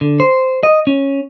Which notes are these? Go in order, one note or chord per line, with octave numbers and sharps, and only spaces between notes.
D3
C5
D#5
C#4